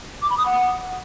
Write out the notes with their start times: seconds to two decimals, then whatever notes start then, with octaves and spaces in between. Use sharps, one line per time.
0.22 D6
0.30 B5
0.38 D#6
0.46 F#5